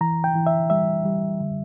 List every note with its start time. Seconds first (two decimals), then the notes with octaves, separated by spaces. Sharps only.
0.01 E3 A#5
0.24 G5
0.35 E3
0.46 E5
0.70 G3 E5
1.05 G3
1.40 D3